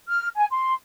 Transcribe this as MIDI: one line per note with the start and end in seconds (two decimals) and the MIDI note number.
0.08 0.28 89
0.36 0.46 80
0.51 0.72 84